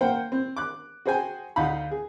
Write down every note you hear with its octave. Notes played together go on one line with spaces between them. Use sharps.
A#3 C5 F#5 G5
C4
D6 F#6
F#4 G#4 C5 G5 G#5
D2 D#4 F5 F#5 B5
G#4